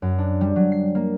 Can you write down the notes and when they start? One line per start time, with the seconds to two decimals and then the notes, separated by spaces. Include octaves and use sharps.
0.02 F#2
0.18 D4
0.41 G3
0.56 F#3
0.72 C7
0.95 A#3